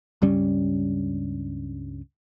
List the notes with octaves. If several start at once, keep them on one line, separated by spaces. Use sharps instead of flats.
C#2 G2 G3 C#4